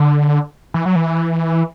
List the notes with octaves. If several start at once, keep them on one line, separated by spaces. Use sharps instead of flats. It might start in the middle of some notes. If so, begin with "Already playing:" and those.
Already playing: D3
E3
F#3
E3